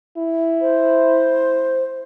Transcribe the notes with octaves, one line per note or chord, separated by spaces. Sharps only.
E4
C5